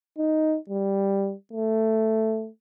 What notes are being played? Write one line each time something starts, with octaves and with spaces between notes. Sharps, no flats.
D#4
G3
A3